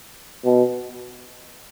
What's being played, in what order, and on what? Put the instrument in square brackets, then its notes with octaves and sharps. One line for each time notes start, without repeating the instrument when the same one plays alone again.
[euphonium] B2